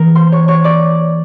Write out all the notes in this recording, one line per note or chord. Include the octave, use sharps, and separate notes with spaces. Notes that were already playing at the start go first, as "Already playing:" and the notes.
Already playing: E3 A#3 A#4 A#5
C5 C6
C#5 C#6
C#5 C#6
D5 D6